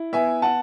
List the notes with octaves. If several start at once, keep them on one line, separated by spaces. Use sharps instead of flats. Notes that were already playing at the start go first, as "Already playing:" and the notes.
Already playing: E4
B3 E5 G#5
F#5 A5